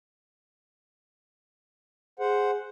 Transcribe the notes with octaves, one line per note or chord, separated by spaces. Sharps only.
G#4 C5 F#5